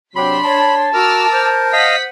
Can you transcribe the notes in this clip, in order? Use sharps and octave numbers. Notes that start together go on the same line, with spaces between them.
C3 F#3 D4 G4 B5 C6 B6
C#5 A5
F#4 A#4 D6 E6 F6
C5
D#5 F5 F#5 D#6 B6